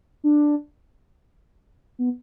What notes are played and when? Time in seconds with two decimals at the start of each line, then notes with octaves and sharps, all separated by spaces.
0.24 D4
1.99 B3